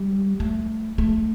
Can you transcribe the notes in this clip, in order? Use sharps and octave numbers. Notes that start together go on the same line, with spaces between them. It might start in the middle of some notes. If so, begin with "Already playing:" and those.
Already playing: G3
A3
A3